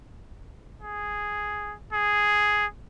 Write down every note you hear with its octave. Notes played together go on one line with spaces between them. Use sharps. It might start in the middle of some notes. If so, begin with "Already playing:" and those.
G#4
G#4